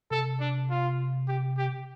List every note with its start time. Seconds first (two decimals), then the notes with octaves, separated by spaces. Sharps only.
0.11 C3 A4
0.40 D4
0.70 F4
1.28 G4
1.57 G4